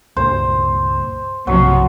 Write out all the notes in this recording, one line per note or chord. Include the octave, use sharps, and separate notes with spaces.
C#2 G2 A#2 C5
B1 G2 C3 F3 F#3 A3